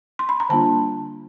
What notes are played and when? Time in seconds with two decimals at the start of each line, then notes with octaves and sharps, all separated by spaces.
0.19 C6
0.29 B5
0.40 A#5
0.49 D3 G3 A#3 D4 F4 A5